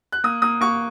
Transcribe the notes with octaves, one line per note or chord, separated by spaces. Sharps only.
F#6
A#3 D#6
A#3 D#6
A#3 C#6